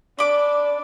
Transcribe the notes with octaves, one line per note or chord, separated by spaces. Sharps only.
D4 B5 D6